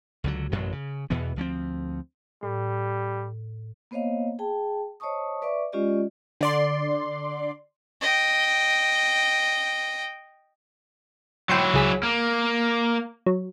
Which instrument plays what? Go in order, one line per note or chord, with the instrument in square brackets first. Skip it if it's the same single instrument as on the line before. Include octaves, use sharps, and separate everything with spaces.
[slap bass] C#2 D3 F#3
A1 F#2 B2 F#3
C#3
E2 B2 E3 B3
D2 F3 A3 C4
[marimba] A2 [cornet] G3
[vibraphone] A#3 B3 C5 C#5 D#5 F5
G#4 G5 A5
C5 C#5 D#5 A5 C#6 D#6
B4 D5 E5 C#6 D6
G#3 C#4 F4 G4 D5 D#5
[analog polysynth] D3 D5 C6
[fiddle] D#5 G5
[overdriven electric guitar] F#3 E4 [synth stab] G5 C6 C#6
[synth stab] C#2 G#4 B6
[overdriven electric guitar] A#3
[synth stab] F#3